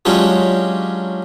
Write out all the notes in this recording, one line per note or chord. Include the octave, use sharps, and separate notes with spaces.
F#3 G#3 C#4 D4 F4 G4